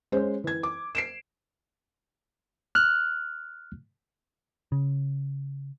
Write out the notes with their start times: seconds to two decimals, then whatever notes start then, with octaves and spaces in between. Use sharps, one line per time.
0.12 G#3 C#4 C5
0.44 E3 G#6
0.63 D6
0.95 C7 D7 E7
2.75 F6 F#6
4.72 C#3